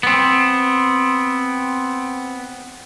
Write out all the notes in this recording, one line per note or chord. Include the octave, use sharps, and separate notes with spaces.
B3 C4